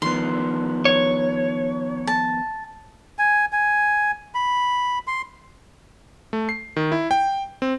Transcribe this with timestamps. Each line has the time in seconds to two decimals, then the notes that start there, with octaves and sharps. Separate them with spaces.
0.02 D#3 F3 B3 C6
0.85 C#5
2.07 A5
3.19 G#5
3.52 G#5
4.35 B5
5.07 C6
6.33 A3
6.49 C7
6.76 D#3
6.92 E4
7.11 G5
7.62 C4